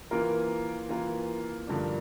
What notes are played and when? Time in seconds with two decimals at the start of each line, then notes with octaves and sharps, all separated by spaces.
0.11 E3 A#3 F4 A#4
0.89 E3 A#3 F4 A#4
1.67 G2 D3 F3 A#3 D4